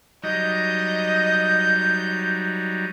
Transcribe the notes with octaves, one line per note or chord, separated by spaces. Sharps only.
F#3 G3 D#4 D#5 G6